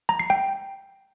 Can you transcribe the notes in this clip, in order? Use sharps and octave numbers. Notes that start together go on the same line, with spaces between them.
A#5
C7
G5